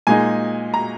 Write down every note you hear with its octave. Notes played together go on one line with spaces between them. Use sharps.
A#2 G#3 D#4 G#5
A#5